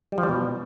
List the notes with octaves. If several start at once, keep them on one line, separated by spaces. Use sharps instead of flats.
G3
F3
G3
B2